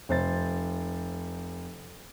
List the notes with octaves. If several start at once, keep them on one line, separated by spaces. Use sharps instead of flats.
F1 C5 A6